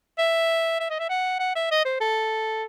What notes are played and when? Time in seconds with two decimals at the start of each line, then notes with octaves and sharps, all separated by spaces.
0.18 E5
0.80 E5
0.90 D#5
1.00 E5
1.10 F#5
1.40 F#5
1.56 E5
1.71 D#5
1.85 C5
2.00 A4